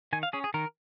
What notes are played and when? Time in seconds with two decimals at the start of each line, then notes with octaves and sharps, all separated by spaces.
0.13 D#3 G#5
0.23 F5
0.33 C#4 G#4
0.44 G#4
0.54 D#3 A#4